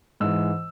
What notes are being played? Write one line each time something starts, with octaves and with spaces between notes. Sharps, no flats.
G#2 E3 E6